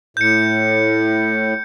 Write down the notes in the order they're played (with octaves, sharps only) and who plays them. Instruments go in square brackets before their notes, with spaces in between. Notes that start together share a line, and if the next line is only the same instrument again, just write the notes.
[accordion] A2 [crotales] G6 C#7